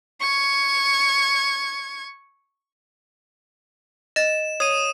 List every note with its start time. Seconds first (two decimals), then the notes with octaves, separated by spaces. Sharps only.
0.21 C#6 G#6
4.16 D#5 A6 E7
4.60 C#5 D#6 D#7